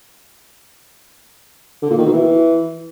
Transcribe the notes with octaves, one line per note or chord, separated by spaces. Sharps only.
D3
A#2
D#3
B2
E3